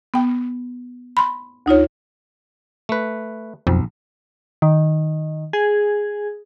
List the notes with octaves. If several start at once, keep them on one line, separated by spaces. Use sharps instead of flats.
B3 G5
B5 C6
D2 D#4 F4 C#5
A3 B4
B1 F2
D#3
G#4